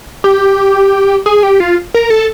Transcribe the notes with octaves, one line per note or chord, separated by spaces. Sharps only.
G4
G#4
G4
F4
A#4
A4